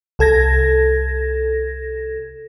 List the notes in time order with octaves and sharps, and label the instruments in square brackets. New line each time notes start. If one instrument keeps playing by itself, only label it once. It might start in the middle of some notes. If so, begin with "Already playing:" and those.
[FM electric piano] C2 A4 G#6 A#6